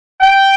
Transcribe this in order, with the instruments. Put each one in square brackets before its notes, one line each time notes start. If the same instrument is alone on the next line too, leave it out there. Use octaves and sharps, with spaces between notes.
[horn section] G5